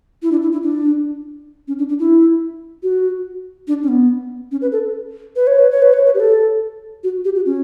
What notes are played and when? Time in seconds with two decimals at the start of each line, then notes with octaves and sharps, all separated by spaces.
0.22 E4
0.32 D4
0.42 E4
0.52 E4
0.63 D4
1.68 C#4
1.78 D4
1.89 D4
1.99 E4
2.83 F#4
3.68 D4
3.83 C#4
3.88 B3
4.51 C#4
4.62 B4
4.72 A4
5.36 B4
5.47 C#5
5.59 B4
5.71 C#5
5.82 B4
5.93 C#5
6.05 B4
6.14 G4
6.20 A4
7.03 F#4
7.25 G4
7.35 F#4
7.46 C#4